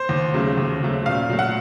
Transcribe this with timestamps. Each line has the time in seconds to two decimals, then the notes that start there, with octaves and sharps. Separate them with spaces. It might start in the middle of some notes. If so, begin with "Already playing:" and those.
Already playing: C5
0.09 D#2
0.34 C#3 F#3 A3
0.57 D#2
0.82 C#3 F#3 A3
1.06 A#2 F5
1.30 F#3 A3
1.39 F#5